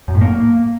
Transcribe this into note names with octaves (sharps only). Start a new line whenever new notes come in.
F#2
A2
A#3